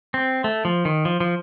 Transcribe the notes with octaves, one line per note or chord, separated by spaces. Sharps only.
C4
A3
F3
D#3
F3
F3